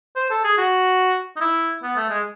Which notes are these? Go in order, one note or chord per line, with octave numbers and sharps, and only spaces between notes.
C5
A4
G#4
F#4
D#4
E4
B3
A3
G#3